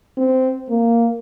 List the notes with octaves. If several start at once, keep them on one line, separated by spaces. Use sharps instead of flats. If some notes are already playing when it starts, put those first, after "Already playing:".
C4
A#3